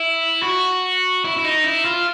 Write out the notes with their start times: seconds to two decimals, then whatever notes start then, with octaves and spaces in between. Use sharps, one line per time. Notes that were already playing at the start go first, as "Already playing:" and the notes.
Already playing: E4
0.42 F#4
1.25 E4
1.37 E4
1.44 D#4
1.64 E4
1.85 F4